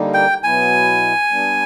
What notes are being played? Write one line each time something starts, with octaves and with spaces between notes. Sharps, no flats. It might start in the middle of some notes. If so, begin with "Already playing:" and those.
Already playing: D3 G3 A#3 D#4
G5
B2 F#3 B3 E4 G#5
G3 B3 D4